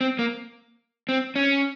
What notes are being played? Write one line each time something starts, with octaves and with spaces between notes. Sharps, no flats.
C4
A#3
C4
C#4